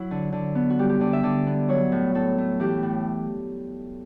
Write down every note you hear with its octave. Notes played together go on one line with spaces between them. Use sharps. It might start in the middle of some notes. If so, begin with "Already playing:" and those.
Already playing: F#3 E4
D3
D3
B3
F#4
G3 G4
G4
D3 D5
E5
D3 D5
B3
F#3 C#5
A2
A2 A4
A3
E3 G4
A2